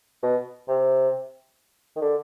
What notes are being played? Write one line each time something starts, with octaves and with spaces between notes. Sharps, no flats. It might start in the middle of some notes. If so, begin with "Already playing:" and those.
B2
C3
D#3
D3